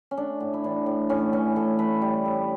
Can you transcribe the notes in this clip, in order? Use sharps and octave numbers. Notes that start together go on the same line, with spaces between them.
C#4
A3 D4
A2
E4
E3 D4
A2
A2 C#4
E3 C#4
A2 A4
A3 B4
G3
A2